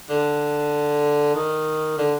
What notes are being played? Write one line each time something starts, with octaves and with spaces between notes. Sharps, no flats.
D3
D#3
D3